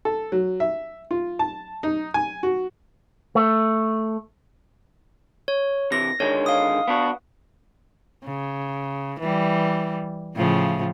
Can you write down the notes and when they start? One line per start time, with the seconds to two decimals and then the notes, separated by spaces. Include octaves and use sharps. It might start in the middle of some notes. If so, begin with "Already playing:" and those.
0.05 A4
0.32 F#3
0.60 E5
1.11 F4
1.39 A5
1.83 D#4
2.14 G#5
2.43 F#4
3.35 A3
5.48 C#5
5.92 C3 E3 A#6
6.20 D3 D#3 G#3 C#5
6.46 F5 D#6
6.88 B3 D4 F#4
8.24 C#3
9.20 E3 G3
10.35 A2 C#3 F3